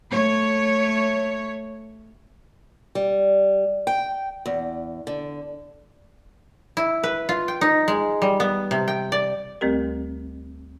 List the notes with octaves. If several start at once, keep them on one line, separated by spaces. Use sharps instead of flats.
A3 C#5
G3
G5
E2
D3
E4
B4
F4
G5
D#4
G#3
G3
B3
C3
G5
D5
D2 G3 A3 C4 G4 A#4